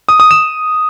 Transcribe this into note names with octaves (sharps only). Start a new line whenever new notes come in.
D#6
D#6
E7